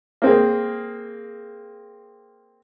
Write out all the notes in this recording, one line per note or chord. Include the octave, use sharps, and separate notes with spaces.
A#3 C4 G#4